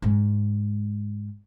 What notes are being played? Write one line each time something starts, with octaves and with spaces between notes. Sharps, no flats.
G#2 G#3